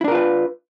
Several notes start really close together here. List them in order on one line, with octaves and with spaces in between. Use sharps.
E4 D4 A#4 F4 B4